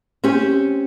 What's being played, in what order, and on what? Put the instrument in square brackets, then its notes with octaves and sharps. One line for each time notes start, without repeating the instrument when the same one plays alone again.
[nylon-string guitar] C4 C#4 G4